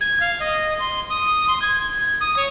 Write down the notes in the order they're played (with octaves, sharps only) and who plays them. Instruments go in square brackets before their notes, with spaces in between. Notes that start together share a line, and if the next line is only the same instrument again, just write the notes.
[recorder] G#6
F5
D#5
C6
D#6
C6
G#6
G#6
D#6
C#5